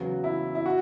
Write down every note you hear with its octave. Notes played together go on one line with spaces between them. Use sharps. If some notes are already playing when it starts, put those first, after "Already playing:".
Already playing: E2 C#3 F#3 B3 F#4
E4
E4
F#4